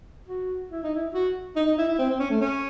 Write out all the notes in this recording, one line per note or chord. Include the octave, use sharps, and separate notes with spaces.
F#4
E4
D#4
E4
F#4
D#4
D#4
E4
E4
C4
C4
C#4
A3
C#4